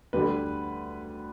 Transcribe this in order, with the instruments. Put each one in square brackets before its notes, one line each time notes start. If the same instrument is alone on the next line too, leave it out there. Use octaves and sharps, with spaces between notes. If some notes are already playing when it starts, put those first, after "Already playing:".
[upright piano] D2 D3 G3 B4